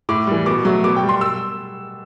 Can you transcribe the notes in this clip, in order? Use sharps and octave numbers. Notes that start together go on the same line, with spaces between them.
A2 D6
E3 G3
B2 D6
F#3 A3
B2 D6
G5
G3
C6
E6